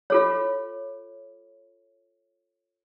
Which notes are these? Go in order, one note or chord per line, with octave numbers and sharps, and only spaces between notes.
F4 A4 C#5